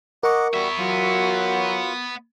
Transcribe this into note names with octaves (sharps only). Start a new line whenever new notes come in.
A#4 D#5 F#5 C#6 D6
G3 B3 F#4 E5
F#3 F4